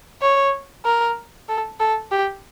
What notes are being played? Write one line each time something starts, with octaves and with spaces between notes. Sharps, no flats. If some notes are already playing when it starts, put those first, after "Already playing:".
C#5
A#4
A4
A4
G4